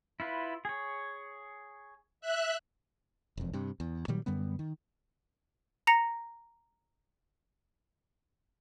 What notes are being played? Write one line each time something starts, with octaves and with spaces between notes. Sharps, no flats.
E4 F4 B4
G#4 C#5
E5 F#6
E1 F2
G2 C3
E2
A#2 D#3 F#3 G3
F#2 D3 G3 B3
D#3
A#5 A#6 C#7 F7